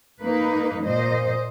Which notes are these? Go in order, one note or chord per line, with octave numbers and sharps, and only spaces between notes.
A#3 D#4 B4
A#2 C5 D#5